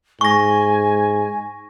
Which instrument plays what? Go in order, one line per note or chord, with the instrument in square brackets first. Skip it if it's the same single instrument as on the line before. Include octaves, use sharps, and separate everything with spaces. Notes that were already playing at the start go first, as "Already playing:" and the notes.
[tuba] G#2 [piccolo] G#5 [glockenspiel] C#6 A#6